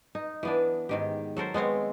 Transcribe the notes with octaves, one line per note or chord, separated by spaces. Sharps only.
D#4
E3 B3 D4
G#2 D#3 G4
F#3 A4 A#4 C5
G#3 B3 C4 C#5